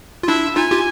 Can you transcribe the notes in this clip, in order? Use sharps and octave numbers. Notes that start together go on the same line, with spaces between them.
F4
D4 E4 E5
D#4 F4 G#5
F4 G4